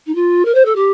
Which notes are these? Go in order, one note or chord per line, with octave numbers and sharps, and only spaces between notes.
D#4
F4
A#4
C5
A4
G4